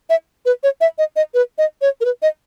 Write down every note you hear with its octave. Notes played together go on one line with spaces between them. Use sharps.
E5
B4
C#5
E5
D#5
D#5
B4
D#5
C#5
A#4
B4
D#5